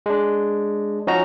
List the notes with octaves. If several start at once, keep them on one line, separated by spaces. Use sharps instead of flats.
G#3 D4
F3 C#4 D#4 F#4 A#5